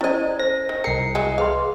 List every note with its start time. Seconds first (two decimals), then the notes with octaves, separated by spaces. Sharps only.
0.01 C#4 E4 C5 D5 D#5
0.40 C5 A#6
0.69 D#3
0.84 C2 A#4 C7 C#7
1.15 E3 F#3 G#3
1.38 G#4 B4 F5 C6